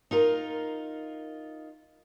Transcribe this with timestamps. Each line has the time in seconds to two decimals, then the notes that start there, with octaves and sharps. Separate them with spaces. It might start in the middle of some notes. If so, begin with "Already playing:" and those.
0.11 D#4 F4 A#4